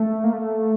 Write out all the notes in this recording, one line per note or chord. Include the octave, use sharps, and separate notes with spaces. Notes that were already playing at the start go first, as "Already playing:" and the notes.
Already playing: A3
A#3
A3